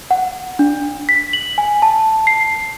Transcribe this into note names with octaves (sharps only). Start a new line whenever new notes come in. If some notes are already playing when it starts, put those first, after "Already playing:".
F#5
D4
B6
F#7
G#5
A5
C7